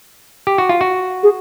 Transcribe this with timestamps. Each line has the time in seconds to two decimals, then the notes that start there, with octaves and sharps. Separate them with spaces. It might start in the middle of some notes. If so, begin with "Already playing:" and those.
0.47 G4
0.58 F#4
0.69 F4
0.81 F#4
1.23 G#4